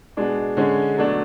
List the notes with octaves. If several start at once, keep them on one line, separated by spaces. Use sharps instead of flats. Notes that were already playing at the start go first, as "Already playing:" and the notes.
B2 G#3 D4
D3 G#3 C#4
B2 F#3 A3 D4